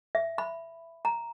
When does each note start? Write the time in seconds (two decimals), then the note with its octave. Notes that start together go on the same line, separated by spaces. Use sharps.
0.15 E5
0.38 B5
1.05 A#5